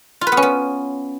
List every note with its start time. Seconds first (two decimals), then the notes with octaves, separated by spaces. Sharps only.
0.21 F4
0.27 B4
0.32 B3
0.37 C#4
0.42 B3